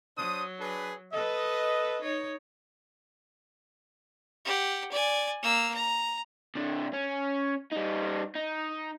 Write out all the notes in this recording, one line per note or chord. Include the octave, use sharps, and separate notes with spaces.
F#3 D4 C5 D#6
D4 G#4 B4
A4 B4 D#5
D#4 C#5
G4 F#5
D5 G#5
A#3 E6
A#5
C3 D4
C#4
G3 D#4
D#4